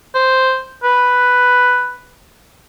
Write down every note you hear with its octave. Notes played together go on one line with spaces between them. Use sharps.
C5
B4